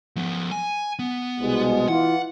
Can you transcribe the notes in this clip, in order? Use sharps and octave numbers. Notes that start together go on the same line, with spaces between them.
F3 B3
G#5
B3
C2 B2 G#3
E3 F4 F#5